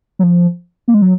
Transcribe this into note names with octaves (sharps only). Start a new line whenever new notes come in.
F#3
F3
A#3
G#3
F#3